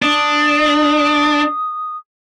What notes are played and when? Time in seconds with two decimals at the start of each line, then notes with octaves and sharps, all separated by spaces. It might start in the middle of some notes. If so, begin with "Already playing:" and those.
0.02 D4 D#6